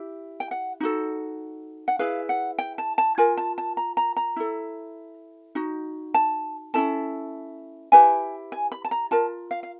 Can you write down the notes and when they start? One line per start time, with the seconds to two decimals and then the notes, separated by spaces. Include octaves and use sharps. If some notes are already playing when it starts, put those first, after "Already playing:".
Already playing: E4 G4
0.40 G5
0.51 F#5
0.80 D#4 F#4 A4
1.88 F#5
1.99 E4 G#4 B4 F5
2.29 F#5
2.59 G5
2.78 A5
2.98 A5
3.18 F4 A#4 G#5
3.37 A5
3.58 A5
3.77 A#5
3.97 A#5
4.17 A#5
4.36 E4 A4
5.55 D#4 F#4
6.14 A5
6.74 C#4 E4 A4 A5
7.92 E4 G4 B4 G#5
8.52 G#5
8.72 B5
8.85 A5
8.91 A#5
9.11 F4 A#4 A5
9.51 F5
9.63 F5